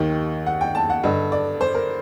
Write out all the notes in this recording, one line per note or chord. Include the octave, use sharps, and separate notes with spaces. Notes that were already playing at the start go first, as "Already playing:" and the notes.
Already playing: D#2 D#3 G4
F#5
G5
A5
F#5
G2 D3 D#5
D5
C5
A#4